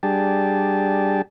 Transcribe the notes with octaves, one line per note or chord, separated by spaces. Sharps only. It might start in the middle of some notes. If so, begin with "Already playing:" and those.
G3 D4 G4 G#4 A5